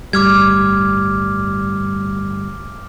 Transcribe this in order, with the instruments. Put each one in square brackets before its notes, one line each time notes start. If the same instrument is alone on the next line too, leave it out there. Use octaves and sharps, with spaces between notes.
[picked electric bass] G1 A2 G3 [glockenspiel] D6 F6 G#6